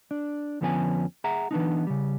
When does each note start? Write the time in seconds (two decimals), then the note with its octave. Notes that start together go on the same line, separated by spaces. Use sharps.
0.11 D4
0.61 F2 D3 F3 B3 C#4 G#5
1.24 G#4 E5 F#5 A#5
1.51 E3 B3 D4 D#4
1.87 C#3 G3